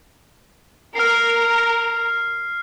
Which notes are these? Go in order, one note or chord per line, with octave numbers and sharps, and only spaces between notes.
A#4 F6 C7